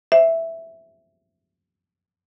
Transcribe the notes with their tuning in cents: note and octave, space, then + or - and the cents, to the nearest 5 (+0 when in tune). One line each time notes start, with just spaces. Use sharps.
C5 -5 E5 +0